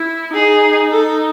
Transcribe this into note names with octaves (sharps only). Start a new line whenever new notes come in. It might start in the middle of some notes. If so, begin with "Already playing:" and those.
Already playing: E4
D#4 G#4
A4